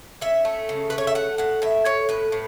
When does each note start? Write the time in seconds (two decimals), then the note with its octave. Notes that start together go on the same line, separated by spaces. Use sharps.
0.21 C#4 E5
0.45 A3
0.69 C#3
0.90 A3 B4
0.98 C#5
1.07 E5
1.15 A3 F#5
1.38 A2 F#5
1.62 A2 E5
1.85 A2 C#5
2.09 A2 B4
2.32 A2